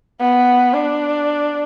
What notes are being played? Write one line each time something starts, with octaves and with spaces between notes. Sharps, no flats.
B3
D4